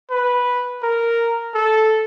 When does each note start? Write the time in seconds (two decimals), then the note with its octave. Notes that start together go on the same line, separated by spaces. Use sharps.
0.11 B4
0.83 A#4
1.55 A4